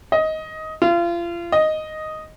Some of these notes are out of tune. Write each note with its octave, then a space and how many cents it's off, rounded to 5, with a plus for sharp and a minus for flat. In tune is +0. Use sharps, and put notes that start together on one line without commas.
D#5 +15
F4 -30
D#5 +0